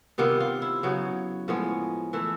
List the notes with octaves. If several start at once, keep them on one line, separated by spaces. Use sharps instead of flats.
C3 D#3 G3 B3 F4
F4
E4
C#3 F#3 B3
A2 F3 G#3 B3
E3 A3 E4